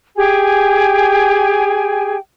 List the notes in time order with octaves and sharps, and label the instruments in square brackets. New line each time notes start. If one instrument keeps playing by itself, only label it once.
[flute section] G4 G#4 G5 G#5